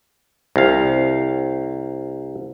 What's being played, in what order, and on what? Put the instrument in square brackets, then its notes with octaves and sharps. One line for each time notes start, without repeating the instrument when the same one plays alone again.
[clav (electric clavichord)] C2 F5